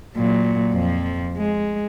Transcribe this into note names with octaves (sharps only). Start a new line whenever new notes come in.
A#2 F#3
F2 F3
G#3